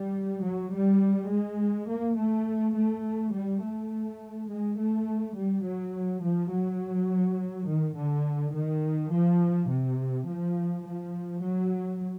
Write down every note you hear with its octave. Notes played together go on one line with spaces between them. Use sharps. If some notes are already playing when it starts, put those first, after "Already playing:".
Already playing: G3
F#3
G3
G#3
A#3
A3
A3
G3
A3
G#3
A3
G3
F#3
F3
F#3
D#3
D3
D#3
F3
C3
F3
F3
F#3